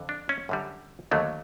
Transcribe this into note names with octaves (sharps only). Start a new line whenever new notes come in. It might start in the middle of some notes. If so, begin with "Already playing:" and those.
Already playing: F2 D3
D4
C#4
F#2 D3 G3
D#2 D3 F#3 A3